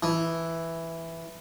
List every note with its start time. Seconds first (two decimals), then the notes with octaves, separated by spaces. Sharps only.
0.03 E3